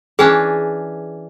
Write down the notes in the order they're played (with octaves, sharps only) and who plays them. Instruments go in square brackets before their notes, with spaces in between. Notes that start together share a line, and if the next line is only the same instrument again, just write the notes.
[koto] E3 C#4 D4 [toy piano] G#4